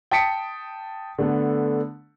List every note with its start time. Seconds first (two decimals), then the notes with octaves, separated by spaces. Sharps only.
0.11 G5 A5 D#6 B6 C#7 D7
1.18 D3 A3 B3